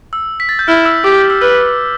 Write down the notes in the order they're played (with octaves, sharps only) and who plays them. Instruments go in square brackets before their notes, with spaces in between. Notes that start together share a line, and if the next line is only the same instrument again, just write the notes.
[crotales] E6
B6
A6
G6
[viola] E4 [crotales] F6
[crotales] E6
[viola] G4 [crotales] D6
[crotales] E6
[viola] B4 [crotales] F6